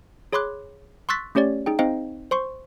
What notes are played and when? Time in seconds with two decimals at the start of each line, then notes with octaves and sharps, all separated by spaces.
0.33 G#4 C#5 B5 C6 D6 F#6
1.09 C6 C#6 E6 F#6 A6 B6
1.35 A3 C#4 G4 C#5 D5
1.66 D#4 G#4 G5
1.79 C4 D#4 C5 D#5 F5 G5
2.31 C5 C6 C#6